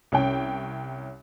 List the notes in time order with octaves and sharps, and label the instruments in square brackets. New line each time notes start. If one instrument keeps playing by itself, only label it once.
[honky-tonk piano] C2 C#4 G5